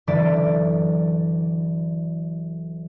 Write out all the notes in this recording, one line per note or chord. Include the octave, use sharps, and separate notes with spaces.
F#1 D3 E3 D5 A6 B6